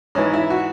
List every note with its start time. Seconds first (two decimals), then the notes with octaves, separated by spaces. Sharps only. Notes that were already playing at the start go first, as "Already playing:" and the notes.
0.15 G#2 E3 C#4
0.33 E4
0.50 F#4